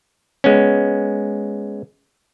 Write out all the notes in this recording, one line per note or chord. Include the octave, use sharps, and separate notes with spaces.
G#3 B3 C#4